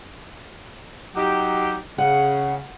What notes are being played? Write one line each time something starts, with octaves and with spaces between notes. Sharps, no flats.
F#3 D#4 G4
C#3 F#5